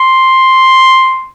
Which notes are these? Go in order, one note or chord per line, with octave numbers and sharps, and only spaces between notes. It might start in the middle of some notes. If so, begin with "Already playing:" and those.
Already playing: C6